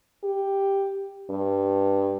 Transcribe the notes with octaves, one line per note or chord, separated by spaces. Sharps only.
G4
G2